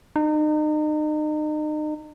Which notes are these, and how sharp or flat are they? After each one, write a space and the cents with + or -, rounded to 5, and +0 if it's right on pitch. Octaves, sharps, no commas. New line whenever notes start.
D#4 -35